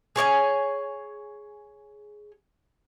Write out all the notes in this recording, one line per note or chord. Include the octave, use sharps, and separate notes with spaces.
G#4 C#5 D#5 G#5